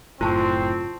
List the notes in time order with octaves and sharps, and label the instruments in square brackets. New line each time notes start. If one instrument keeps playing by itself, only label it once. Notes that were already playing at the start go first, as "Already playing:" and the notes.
[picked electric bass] F#1 A2 [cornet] C4 [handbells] F4 A5 C#6